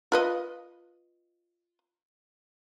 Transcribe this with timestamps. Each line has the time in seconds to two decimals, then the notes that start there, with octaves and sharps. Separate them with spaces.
0.12 F4 B4 D#5